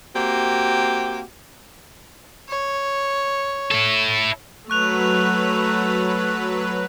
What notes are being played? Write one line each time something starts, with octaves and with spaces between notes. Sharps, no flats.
A#3 C4 F#4 G4
C#5
E4 A4
F#3 A3 B4 C#6 F#6 F7